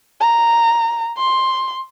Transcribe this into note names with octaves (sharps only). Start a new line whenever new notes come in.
A#5
C6